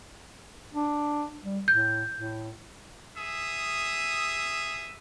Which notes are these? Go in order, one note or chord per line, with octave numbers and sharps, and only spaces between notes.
D4
G3
A2 G6
A2
G#4 E5 D#6